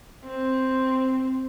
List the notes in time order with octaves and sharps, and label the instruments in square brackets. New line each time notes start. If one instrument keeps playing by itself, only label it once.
[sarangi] C4